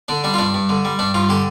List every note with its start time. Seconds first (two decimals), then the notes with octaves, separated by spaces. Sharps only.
0.08 D3 D4
0.24 G3 D4
0.34 F4
0.39 G2 D4
0.54 G2
0.69 D3
0.85 G3
0.99 G2 D4
1.14 G2 F4
1.29 D3 G4